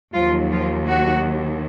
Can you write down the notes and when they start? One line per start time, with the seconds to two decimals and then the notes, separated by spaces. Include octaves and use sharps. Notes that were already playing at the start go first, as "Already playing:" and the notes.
0.13 D#2 D#3 F3 F#3 F4
0.51 F3 F4
0.87 F#3 F#4